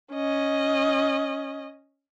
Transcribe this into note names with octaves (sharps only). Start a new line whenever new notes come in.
C#4 D#5